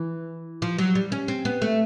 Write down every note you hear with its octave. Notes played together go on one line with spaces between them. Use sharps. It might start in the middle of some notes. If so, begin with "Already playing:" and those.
Already playing: E3
F3
F#3
G3
C#4
C4
B3
A3